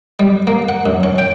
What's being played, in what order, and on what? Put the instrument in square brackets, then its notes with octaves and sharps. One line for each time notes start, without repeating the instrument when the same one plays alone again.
[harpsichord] G3
A#3
F#5
F#2
C#4
G5